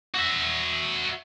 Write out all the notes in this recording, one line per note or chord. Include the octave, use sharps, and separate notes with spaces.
F#4 E5